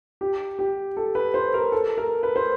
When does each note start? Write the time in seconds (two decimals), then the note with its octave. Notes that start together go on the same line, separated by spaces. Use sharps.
0.21 G4
0.59 G4
0.97 A4
1.15 B4
1.34 C5
1.54 A#4
1.72 A4
1.98 A#4
2.23 B4
2.36 C5